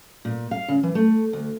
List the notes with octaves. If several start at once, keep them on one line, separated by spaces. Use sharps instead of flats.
A#2
F5
C#3
E3
A3
D2